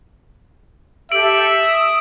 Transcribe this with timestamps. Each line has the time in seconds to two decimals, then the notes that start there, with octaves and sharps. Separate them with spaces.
1.12 G4 A4 E5 E6 D7 F#7
1.60 D#6